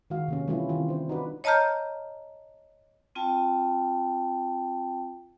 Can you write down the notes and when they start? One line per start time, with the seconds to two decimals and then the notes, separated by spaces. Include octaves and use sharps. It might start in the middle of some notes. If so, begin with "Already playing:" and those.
0.10 D#3 G#3 F#4 F5
0.28 C3 A#3 C#4
0.48 E3 G3 A3 C#4 E4 F4
0.69 D#3 C4 F4
0.89 D4 C5
1.09 D#4 F#4 B4 D5
1.44 C#5 D#5 A5 A#5 F6 G6
3.15 C4 F4 G5 A5